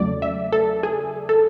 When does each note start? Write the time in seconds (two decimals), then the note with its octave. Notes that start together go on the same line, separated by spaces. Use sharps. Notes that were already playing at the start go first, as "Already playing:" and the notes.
Already playing: E2 C#3 F#3 A3 D5
0.22 E5
0.53 A4
0.83 G#4
1.29 A4